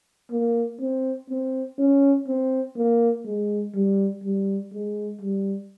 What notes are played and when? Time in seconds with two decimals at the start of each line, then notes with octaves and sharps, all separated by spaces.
0.31 A#3
0.80 C4
1.29 C4
1.78 C#4
2.27 C4
2.76 A#3
3.25 G#3
3.75 G3
4.24 G3
4.72 G#3
5.21 G3